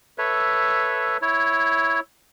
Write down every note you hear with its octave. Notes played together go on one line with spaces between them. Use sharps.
A4 B4 C#5 E5
E4 C#5